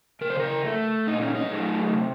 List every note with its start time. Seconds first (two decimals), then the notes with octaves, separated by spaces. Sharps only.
0.21 C#3 A#4
0.30 C5
0.40 A#4
0.64 A3
1.07 A#2 D#4
1.22 C#4
1.35 D#4
1.51 F#3 A3
1.94 C3